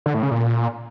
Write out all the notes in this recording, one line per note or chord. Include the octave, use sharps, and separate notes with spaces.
D3
A2
C#3
A#2